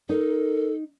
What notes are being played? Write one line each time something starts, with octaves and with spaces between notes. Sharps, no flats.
D#4 A4 A#4